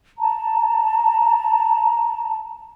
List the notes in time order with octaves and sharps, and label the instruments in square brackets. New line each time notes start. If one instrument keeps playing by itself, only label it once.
[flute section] A5 A#5